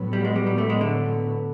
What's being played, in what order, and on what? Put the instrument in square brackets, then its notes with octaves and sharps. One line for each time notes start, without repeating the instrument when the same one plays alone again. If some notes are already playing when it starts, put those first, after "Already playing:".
Already playing: [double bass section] A2 F#3 B3
[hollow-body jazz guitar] G3
G#3
G3
G3
A3
G#3
D3